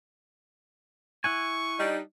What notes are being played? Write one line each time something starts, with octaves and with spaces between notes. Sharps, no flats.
E4 F#5 G#5 C#6
G3 D4 D#4